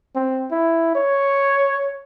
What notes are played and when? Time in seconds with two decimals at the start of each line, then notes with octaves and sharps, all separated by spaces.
0.16 C4
0.52 E4
0.95 C#5